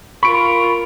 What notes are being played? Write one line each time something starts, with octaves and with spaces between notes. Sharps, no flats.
F4 A#4 B5 C#6 D7